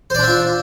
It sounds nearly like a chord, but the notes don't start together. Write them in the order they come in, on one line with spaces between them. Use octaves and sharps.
C5 D5 D4 E5 F4